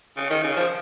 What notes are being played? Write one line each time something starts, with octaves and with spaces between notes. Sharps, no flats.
C#3
D#3
C#3
F3